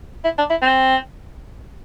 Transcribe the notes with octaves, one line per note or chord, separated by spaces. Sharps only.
E4
D4
E4
C4